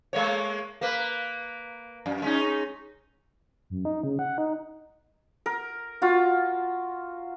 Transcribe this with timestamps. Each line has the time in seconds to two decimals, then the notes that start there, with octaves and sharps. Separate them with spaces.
0.13 G#3 A#3 C#5
0.81 A#3 B4
2.06 F#2
2.22 G#3 C#4 D#4
3.70 F#2
3.85 D#4
4.03 C#3
4.19 F#5
4.38 D#4
5.46 A#4
6.02 F4 F#4